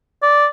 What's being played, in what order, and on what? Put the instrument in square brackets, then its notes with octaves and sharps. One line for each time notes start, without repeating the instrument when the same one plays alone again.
[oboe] D5